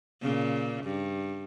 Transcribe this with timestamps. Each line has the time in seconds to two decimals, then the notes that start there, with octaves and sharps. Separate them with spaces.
0.21 A#2 C#3
0.85 G2